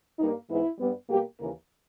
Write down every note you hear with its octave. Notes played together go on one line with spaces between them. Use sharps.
G2 G3 A#3 D#4
G#2 E3 G#3 B3 E4
G2 G3 B3
B2 G3 A#3 G4
D#2 C#3 E3 A#3 A#4